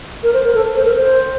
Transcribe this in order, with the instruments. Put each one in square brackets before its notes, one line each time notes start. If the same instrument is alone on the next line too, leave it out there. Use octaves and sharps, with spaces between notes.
[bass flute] A#4
C5
A#4
A4
C5
A#4
C5